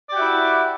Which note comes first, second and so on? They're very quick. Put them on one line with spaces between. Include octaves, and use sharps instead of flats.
D5 G4 F#4 E5 E4